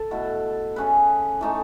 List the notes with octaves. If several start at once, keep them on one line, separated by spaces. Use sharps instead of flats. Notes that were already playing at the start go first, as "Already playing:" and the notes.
Already playing: A4
B2 A3 E4
A3 C#4 G#4 B4
E3 A3 D#4